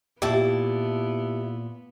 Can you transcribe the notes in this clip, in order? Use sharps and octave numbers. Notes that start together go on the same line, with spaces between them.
A#2 B3 E4 G4 A5